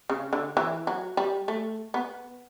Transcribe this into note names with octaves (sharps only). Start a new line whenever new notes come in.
C#3
D3
E3
F#3
G3
A3
B3